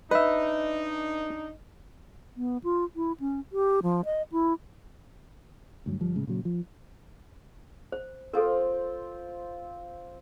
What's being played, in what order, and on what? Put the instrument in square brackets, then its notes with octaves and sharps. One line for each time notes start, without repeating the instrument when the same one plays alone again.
[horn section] D4 D#4 [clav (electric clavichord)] B4 E5 [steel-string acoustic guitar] D#5
[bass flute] B3
F4
E4
C#4
G4
F3
D#5
E4
[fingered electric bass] D2 G2 F#3
G1 F3 G3
A2 C#3 G#3
A#2 C#3 F#3
F3
[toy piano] C5
[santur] C4 F4 [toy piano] A4 A#4